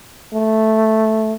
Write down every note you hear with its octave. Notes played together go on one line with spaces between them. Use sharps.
A3